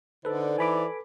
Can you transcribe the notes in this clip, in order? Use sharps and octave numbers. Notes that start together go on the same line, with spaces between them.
D3 D#4 A4 B4 C5 D5
E3 G#5 B5 D6